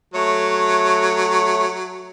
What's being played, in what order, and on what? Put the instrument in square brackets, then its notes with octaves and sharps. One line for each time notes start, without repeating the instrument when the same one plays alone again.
[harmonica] F#3 [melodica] A3 C#5